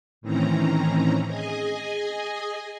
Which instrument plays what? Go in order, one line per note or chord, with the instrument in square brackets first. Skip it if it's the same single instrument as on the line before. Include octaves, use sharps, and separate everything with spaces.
[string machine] A2 D#3 E3 C4 C#4 A#5
G#4 D#5 G#5